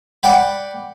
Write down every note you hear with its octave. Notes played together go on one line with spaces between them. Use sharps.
D5 F#5 G5 B5